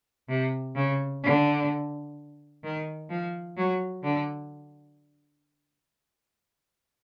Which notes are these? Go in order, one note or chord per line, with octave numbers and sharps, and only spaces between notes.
C3
C#3
D3
D#3
F3
F#3
D3